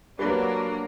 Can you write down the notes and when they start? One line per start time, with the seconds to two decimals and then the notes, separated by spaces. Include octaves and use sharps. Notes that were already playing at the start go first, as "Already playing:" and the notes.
0.19 F#3 A#3 D4 G4 B4